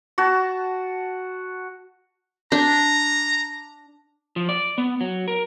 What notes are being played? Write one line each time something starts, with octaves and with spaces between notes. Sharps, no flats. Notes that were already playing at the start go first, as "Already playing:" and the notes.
F#4 A5
D4 A#5
F3
D5
B3
F#3
A#4